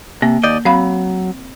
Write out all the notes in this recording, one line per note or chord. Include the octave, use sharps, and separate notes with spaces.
C3 A#3
D#2 D5 D#5 G6
F#3 C4 F5 B5